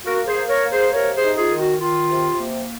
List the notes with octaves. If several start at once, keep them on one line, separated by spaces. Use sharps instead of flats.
A#3 F#4 A#4
G#4 C5
A#3
A#4 C#5
A#3
G#4 C5
C3 A#4 C#5
G#4 C5
D#4
F4 G#4
D#3
F#4
D#3 F4
C3
A#3